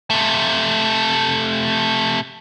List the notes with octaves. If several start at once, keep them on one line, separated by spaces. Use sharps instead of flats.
C3 A3